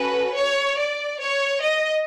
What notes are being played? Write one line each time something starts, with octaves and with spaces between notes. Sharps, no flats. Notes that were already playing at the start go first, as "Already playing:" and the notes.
Already playing: C#4 F#4 A4 B4
C#5
D5
C#5
D#5